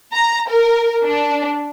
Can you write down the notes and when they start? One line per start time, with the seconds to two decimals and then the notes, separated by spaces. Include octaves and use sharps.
0.13 A#5
0.49 A#4
1.04 D4